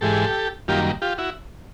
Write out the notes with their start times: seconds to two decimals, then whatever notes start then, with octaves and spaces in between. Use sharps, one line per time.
0.01 G#2 E3 G#3 G4 A4
0.68 F#2 D#3 G3 A#3 F4 G4
1.02 F4 G4
1.18 E4 F#4